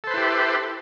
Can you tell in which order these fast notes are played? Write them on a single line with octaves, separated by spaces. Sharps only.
A4 C5 B4 E4 G4